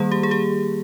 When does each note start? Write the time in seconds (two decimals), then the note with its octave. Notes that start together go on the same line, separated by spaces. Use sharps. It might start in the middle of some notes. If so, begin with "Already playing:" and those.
Already playing: D#3 G3 A#3 G#4
0.12 G4
0.23 G#4
0.31 G4